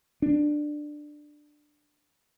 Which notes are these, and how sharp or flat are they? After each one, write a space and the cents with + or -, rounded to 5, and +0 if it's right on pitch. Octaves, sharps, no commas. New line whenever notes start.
D4 +15